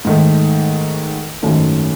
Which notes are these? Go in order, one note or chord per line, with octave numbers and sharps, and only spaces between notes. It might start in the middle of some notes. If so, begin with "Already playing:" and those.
G#2 D#3 A3
G#1 F#2 D#3 A3